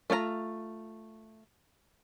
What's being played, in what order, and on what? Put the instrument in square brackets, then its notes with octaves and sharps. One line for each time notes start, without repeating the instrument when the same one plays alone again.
[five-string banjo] A3 F4 D5 A#5